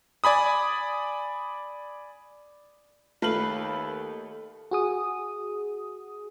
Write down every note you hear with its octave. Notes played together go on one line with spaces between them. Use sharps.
D5 G#5 B5 D#6
D#2 A3 B4 F5 F#7
F#4 G#4 D#6